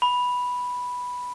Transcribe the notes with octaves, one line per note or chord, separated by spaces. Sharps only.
B5